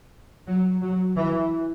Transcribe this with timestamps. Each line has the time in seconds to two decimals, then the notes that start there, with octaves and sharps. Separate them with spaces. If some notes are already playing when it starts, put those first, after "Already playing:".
0.47 F#3
0.81 F#3
1.16 E3